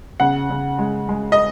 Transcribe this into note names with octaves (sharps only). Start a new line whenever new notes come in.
C#3 F#5
C#3
G#3
G#3
D#5